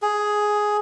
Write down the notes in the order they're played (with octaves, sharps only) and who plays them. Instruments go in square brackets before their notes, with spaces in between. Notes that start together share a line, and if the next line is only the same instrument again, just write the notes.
[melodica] G#4